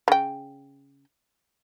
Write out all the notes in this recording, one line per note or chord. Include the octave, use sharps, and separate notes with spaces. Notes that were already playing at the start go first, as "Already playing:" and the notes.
C#3 G5